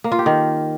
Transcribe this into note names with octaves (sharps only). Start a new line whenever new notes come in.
A#3
F4
G4
D#3